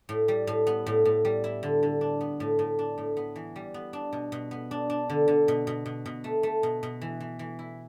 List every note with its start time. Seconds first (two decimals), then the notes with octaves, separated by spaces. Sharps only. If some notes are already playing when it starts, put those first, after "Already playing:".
0.09 A2
0.28 G3
0.47 A2
0.67 B3
0.86 A2
1.05 A2
1.25 G3
1.44 E4
1.63 D3
1.83 D3
2.01 D4
2.21 B3
2.40 A2
2.59 A2
2.79 D4
2.98 A2
3.17 B3
3.36 E3
3.56 G3
3.74 B3
3.93 D4
4.13 B2
4.32 B2
4.51 B3
4.71 D4
4.90 D4
5.09 D3
5.28 D3
5.48 B2
5.67 B2
5.86 B2
6.06 B2
6.24 A3
6.43 A3
6.63 B2
6.83 B2
7.01 E3
7.20 E3
7.39 E3
7.59 E4